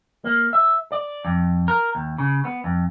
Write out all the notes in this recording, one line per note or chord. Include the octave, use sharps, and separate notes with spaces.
A#3
E5
D5
F2
A#4
D#2
C#3
B3
F2